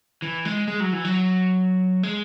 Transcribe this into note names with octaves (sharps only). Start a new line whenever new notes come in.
E3
G#3
G#3
F#3
E3
F#3
G#3